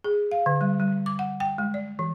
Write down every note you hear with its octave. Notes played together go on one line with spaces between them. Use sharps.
G#4
F5
D3
G3
G3
D6
F#5
G5
G#3
D5
E3